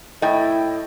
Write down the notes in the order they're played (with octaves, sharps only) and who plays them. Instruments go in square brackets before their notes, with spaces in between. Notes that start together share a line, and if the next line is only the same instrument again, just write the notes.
[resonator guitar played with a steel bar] A2 [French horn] E4 [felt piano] D#5 G5